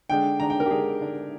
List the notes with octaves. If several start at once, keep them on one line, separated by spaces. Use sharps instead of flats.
D3 G#3 D4 G5
D3 G#3 D4 A#5
G5
A#4
G4
D3 G#3 D4 G#4
D3 G#3 D4